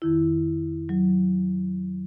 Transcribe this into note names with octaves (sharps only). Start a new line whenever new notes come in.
F2 D#3 E4
F#3